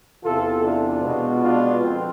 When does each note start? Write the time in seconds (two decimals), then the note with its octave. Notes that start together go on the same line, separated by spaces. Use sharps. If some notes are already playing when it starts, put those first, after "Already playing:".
0.23 E2 C3 E3 F4 A4
0.63 D4 F4
1.03 B2 G#3 B3
1.43 D4 F4
1.82 F2 C4